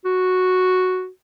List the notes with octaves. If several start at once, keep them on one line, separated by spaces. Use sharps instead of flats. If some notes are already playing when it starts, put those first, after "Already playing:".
F#4